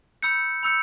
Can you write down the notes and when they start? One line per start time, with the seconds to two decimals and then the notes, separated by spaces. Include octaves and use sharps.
0.22 B5 E6 G6 C#7
0.63 B5 E6 G6 C#7